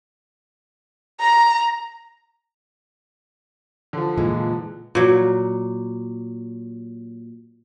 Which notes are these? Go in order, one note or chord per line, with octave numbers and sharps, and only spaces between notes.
A#5
D3 F3
A#2 E3 G#3
A#2 F#3